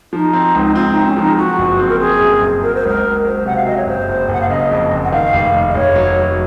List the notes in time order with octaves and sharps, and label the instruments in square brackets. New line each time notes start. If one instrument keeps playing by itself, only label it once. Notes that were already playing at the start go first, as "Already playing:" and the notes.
[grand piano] F3 [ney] D#4
[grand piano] C4
C#2
[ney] D#4
[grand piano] C4 [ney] F4
[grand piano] C4 [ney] D#4
[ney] C#4
[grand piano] F3 [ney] C#4
[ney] D#4
[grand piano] F3 [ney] F#4
[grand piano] F#1
C4
[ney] A#4
[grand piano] C4 [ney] G#4
[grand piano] F#2
F#2
[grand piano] F#3 [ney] A#4
[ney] C5
[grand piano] C#2 [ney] A#4
[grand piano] C#2
[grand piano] F#3 [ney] C5
[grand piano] C3 [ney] F#5
[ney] F5
[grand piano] F#3 [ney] D#5
[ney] C#5
[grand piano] F#1 [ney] C5
[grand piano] F#1
[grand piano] F#1 [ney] F#5
[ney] F5
[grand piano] C#3 [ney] D#5
[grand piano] F2
F#1
[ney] F#5
[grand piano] D#3 [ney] F5
[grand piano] F1
F1
[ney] D#5
[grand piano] F1 [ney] C#5
[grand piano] F#3
F#3